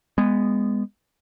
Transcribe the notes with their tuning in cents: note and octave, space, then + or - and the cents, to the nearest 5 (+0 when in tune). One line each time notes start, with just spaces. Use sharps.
G#3 -20 B3 +0